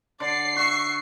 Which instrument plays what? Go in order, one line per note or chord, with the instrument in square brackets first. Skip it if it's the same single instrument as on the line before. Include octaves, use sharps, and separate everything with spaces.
[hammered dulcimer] D3 [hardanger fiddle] D5 [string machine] C7
[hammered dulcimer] F#4 E5 [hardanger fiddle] C#6